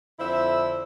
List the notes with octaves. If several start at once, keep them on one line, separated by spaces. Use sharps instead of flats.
F2 D3 E4 C5 E5